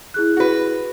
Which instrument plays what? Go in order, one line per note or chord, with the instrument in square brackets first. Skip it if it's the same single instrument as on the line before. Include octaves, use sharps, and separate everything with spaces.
[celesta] E4 G#4 F#6
[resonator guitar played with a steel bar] F#4 B4